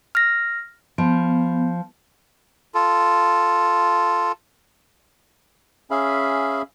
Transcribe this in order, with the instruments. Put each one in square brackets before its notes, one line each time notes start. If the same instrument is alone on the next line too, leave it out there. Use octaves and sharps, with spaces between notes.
[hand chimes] F6 A#6
[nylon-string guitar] F3 [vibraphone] B3
[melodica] F4 A4
[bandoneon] C#4 G#4 E5 F5 B5